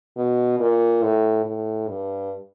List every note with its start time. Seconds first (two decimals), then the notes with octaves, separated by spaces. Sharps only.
0.17 B2
0.60 A#2
1.03 A2
1.46 A2
1.88 G2